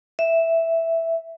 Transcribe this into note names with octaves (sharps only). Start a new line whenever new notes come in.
E5